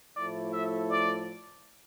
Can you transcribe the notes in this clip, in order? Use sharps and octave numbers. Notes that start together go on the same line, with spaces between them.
A2 F3 A3 E4 A4 D5
E5
D5